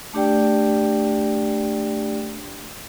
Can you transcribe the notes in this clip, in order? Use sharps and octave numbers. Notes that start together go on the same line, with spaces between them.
A3 D4 G4 D5 G5